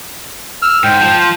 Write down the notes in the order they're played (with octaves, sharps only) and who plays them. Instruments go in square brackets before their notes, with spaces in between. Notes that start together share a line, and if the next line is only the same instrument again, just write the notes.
[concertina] E6 F6
[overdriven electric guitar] G#2 [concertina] G5
[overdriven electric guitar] F3